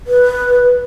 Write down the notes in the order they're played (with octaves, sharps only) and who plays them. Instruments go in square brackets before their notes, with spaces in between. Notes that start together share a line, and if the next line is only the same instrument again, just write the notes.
[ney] B4